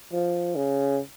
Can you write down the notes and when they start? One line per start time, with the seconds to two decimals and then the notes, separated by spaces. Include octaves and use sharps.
0.13 F3
0.56 C#3